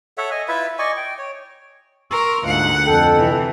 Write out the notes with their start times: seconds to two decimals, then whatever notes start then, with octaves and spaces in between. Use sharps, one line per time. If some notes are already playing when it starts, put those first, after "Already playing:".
0.18 A4 C#5 E5 F#5
0.31 D#5 G#5
0.48 E4 F4 B4 E5
0.79 D5 D#5 G#5 C#6
0.97 G5
1.18 C#5
2.11 A#4 C6 C#6 E6
2.43 D2 G#2 F3 A#3 F#5
2.86 F2 A4 G5
3.15 C3 E3